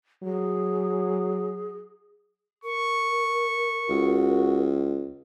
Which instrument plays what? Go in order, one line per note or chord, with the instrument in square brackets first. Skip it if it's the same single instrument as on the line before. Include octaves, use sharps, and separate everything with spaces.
[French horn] F#3 [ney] G#4
[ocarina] A#4 [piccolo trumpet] C#6
[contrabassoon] C#2 [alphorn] F#4